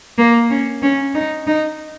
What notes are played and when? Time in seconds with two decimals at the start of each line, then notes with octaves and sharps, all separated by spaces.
0.18 A#3
0.50 C#4
0.82 C#4
1.14 D#4
1.47 D#4